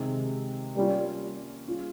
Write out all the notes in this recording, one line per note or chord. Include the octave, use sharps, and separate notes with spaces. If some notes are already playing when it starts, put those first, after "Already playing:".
Already playing: C3 D#3 G#3 C4
G3 A#3 C#4 F4
G3 C#4 F4 G#4